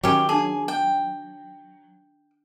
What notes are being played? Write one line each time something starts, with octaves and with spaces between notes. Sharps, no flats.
D#3 F#3 C#4 G4
D4 G#4 A5
G5